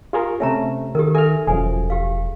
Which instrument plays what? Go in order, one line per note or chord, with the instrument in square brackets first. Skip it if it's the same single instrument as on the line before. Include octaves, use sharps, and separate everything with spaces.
[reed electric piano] F4 G#4 A#4 [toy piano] G4
[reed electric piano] C3 A3 C#4 [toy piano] E5 A5 A#5
[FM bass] D#3 [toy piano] G4 A4 A#4
[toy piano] A4 A#4 E5 [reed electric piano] G#5 F6
[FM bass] E1 [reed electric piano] F#2 F3 G#4 [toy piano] G#5
[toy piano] G4 F5